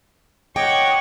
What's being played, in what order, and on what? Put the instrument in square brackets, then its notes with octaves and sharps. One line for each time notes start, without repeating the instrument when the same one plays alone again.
[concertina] C#5 D#5 D6 [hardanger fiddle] F#5 C#6 [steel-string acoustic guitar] G5